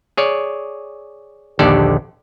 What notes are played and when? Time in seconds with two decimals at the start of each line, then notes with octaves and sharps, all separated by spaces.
0.17 G#4 C#5 D5
1.59 A#1 D#2 D3 G4 A4 D5